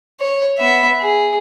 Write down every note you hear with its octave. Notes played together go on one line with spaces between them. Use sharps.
C#5
B3 E5
G#4